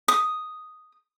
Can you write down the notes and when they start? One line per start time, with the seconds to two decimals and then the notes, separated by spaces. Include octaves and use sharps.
0.08 D#6